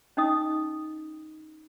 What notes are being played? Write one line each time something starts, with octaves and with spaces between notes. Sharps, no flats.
C#4 D#4 D#5 D#6